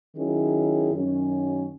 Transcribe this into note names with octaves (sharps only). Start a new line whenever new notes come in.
D#3 F#3 C#4 E4 G#4
F#2 D#3 F#3 C#4